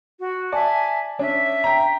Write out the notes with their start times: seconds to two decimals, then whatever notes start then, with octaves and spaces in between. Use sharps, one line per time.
0.20 F#4
0.52 D5 E5 G#5 A5
1.19 C#4 D4 E5
1.64 G5 A#5